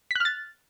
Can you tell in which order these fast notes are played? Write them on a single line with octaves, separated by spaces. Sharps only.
B6 F#6 F6 A6